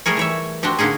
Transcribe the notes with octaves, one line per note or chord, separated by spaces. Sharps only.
G3 A3 G#4 A#4 C#5
E3 C#5 E5
C4 D4 F#4 G4
D3 A#3 C#4 D#4 G#4